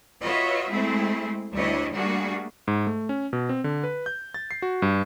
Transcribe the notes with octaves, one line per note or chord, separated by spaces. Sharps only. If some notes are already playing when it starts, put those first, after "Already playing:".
F4 F#4 B4 C#5 D#5 E5
G#3 A3 C4 E4 G#4
D2 G3 D4 E4 C#5 D#5
G3 A3 A#3 D4 F#4 G#4
G#2
A3
C#4
B2
C4
D3
B4
G6
A6
C7
F#4
G2